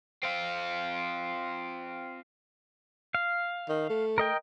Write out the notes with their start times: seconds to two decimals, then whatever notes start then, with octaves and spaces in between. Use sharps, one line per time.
0.23 C4 F4
3.15 F5
3.69 D#3
3.89 A3
4.18 A#4 D#5 G5